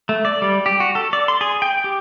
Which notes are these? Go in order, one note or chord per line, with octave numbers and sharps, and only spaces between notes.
A3
D5
G3
G4
F#4
A4
D5
C6
G#4
G5
G4